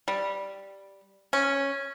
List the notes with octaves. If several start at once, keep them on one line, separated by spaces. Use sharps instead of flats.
G3
C#4